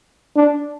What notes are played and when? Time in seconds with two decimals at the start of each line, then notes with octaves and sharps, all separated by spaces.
0.36 D4